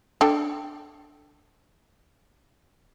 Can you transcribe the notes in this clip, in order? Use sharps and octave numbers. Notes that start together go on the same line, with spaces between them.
D4 A4 G5